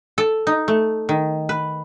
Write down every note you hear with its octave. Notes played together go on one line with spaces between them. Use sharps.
A4
D#4
A3
D#3
B4